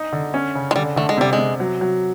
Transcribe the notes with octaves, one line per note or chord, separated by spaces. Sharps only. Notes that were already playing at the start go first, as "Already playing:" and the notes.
Already playing: D#4
D3
C#4
C#3
G#3
D3 G3
D3 A3
G#3
C3 G3
G#3
C3
F#3
F#3